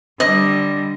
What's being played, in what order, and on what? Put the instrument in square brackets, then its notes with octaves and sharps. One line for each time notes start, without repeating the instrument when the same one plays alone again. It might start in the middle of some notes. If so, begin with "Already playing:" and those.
[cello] D3 G3 [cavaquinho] D#5